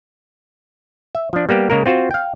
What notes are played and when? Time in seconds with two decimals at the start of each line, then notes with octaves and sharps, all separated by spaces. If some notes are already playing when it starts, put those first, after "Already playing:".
1.15 E5
1.33 F3 D4
1.49 G3 A#3 B3 G4
1.70 C#3 G#3 A#3 A#4
1.86 C4 F4 F#4 C5
2.11 F5 G5